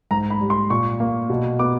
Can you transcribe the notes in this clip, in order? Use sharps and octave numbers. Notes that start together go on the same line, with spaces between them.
G#2 A#5
B5
G3
C6
A#2 C#6
A#3
B2
B3 D6